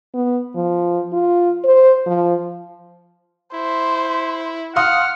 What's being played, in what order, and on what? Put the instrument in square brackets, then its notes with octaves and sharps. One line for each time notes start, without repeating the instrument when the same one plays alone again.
[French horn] B3
F3
F4
C5
F3
[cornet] E4 [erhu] C5
[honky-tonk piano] F5 C6 D#6 [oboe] F#5 [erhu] F6